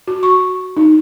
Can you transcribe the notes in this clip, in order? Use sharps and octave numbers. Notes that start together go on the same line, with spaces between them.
F#4
C#6
D#4